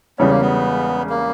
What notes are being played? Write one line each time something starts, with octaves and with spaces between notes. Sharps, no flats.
E1 E2 C#3 G3 B3 C#4
A#3
B3
A#3